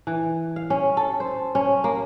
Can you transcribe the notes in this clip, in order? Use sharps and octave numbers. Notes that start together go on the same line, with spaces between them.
E3
F5
C#4
A4
C5
C#4
A#3